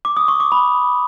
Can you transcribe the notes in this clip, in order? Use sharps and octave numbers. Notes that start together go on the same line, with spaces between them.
D6
D#6
C#6
D6
B5